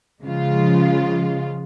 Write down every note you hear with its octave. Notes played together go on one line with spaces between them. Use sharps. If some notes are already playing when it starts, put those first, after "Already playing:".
C#3 F3 G#3 F4